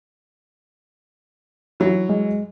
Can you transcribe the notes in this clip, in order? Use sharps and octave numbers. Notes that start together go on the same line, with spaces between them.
E3 F#3
G#3